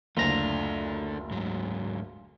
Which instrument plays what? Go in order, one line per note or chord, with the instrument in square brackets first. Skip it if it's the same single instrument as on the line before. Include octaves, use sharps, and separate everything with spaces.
[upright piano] F#1 D2 [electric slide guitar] A3 D4 [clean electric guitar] F4 A#5
[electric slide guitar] G#2 F#3